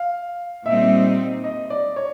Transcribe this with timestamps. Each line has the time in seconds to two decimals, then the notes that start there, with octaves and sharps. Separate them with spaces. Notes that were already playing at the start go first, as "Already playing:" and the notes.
Already playing: F5
0.65 A#2 G3 C4 D#4 E5
1.44 D#5
1.70 D5
1.96 C#5